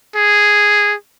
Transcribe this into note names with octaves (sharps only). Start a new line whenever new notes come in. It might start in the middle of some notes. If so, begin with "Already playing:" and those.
G#4